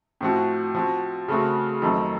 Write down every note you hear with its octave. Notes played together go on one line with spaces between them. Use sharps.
A2 F3 C4 F#4
F3 C4 F#4
C#3 A3 C4 F#4
F2 D#3 F#3 A3 C4